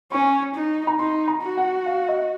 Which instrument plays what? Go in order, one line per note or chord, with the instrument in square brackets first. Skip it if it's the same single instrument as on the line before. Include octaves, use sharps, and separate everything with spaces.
[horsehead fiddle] C#4 [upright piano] C#6
[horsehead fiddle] D#4
[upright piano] A#5
[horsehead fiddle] D#4 [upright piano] C6
[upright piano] A#5
[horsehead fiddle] F#4
[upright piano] F#5
F5
D#5